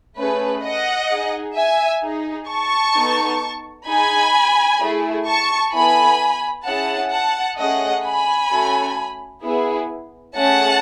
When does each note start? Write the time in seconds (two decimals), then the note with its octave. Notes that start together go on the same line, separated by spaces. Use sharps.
0.17 A3 C#4 G#4 B4
0.63 D#5 F#5
1.09 D#4 G#4
1.55 E5 G#5
2.02 D#4 G#4
2.48 A5 C#6
2.95 B3 D#4 A4
3.87 D#4 G#4 G#5 B5
4.80 A3 E4 G#4
5.26 A5 C#6
5.73 B3 E4 A4 G#5 B5
6.65 C#4 E4 G#4 F#5 A5
7.11 F#5 A5
7.57 A3 C#4 G#4 D#5 F#5
8.04 G#5 B5
8.50 A3 C#4 F#4 A4
9.43 B3 E4 G#4
10.36 A3 C#4 G#4 F#5 A5